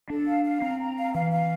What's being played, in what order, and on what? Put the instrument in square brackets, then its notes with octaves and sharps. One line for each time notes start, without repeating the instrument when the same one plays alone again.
[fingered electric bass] D4 [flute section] A4
[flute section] F5
F5
[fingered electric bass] C4 [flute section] A#5
[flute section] A#5
F5
[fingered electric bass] E3 [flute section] F5
[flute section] F5